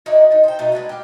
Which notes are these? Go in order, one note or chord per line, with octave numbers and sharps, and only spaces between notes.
D#4 E4 F#4 D5
D#4 A5
C5 G5
B2 A3 D#4
G#3 D4 B4 F#5
G4 F5